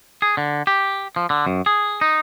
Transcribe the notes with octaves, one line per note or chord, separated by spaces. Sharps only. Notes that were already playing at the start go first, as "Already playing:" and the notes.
G#4
D3
G4
F3
D3
F#2
G#4
D#4